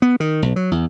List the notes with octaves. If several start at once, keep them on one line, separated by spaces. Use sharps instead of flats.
B3
D#3
B1
F#3
E2